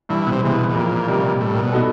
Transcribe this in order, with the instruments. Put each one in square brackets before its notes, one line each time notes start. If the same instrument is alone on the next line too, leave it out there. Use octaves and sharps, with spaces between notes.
[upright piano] G2 [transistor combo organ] E3
[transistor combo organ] B2
C3
[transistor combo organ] C3 [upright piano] E3 G#3 B3
[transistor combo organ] B2
B2
[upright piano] F2 [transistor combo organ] A#2
[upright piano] C3 D#3 G3
[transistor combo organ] A2 [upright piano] G3
[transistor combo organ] A#2
B2
[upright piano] B3 D#4 F#4 A4